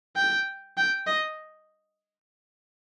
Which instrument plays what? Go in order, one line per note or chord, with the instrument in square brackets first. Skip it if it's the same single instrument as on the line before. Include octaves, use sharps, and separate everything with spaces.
[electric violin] G5
G5
D#5